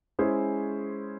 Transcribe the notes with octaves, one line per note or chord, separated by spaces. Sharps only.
G#3 C#4 E4 G#4 C5